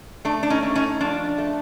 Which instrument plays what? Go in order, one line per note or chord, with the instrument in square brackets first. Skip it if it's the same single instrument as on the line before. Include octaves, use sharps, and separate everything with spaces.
[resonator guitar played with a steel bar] A3 D4
D4
C#4 D#4
A3
C#4 D#4
F3 D4
A3